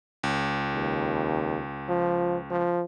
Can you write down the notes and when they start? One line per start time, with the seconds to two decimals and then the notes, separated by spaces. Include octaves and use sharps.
0.23 C#2
0.74 D#2
1.88 F3
2.50 F3